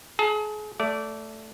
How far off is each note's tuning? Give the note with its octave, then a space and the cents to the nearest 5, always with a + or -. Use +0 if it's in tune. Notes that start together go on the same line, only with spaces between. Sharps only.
G#4 +35 A5 +25
A3 +0 D5 -20